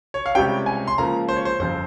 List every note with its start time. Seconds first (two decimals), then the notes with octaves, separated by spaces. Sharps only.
0.14 C#5
0.26 F5
0.35 C#2 C3 G3 C#4 G5
0.66 G#5
0.88 C6
0.98 C#2 C#3 F3 A#3 A#5
1.29 C5
1.36 C#5
1.45 C5
1.59 G1 F2 C#3 C5